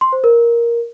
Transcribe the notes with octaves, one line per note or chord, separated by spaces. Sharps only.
C6
C5
A#4